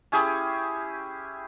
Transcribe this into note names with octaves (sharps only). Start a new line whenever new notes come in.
C#4 E4 G4 G#4